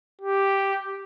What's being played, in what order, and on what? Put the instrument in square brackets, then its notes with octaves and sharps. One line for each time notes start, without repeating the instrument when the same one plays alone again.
[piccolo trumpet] G4